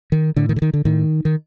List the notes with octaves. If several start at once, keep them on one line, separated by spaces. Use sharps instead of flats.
D#3
A2 D3
D#3
D3
D#3
D3
A2 D#3
D#3